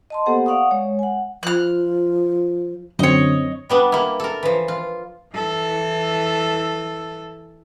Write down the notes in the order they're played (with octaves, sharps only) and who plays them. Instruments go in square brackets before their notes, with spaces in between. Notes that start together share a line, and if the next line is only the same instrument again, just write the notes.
[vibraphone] D#5 A5 C6
A#3 B3 G4 A4 C5 F#5
D5 F5 F#5 C#6 D#6
G#3 C#5
F#5 G#5
[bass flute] F3 [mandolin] F6 F#6
[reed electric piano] F#2 C4 [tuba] D3 [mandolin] C#5 D#5
[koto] G3 B3 D4
A#3 E4
A4 A#4
E3 F3
F4
[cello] E3 A4